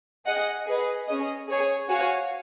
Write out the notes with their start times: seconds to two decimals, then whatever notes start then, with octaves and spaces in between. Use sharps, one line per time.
0.27 G#4 D#5 F#5
0.67 G#4 B4 D#5
1.08 C#4 G#4 D#5
1.48 G#4 C#5 G#5
1.89 F#4 C#5 F5 G#5